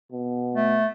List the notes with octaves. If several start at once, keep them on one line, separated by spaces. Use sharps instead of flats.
B2
A3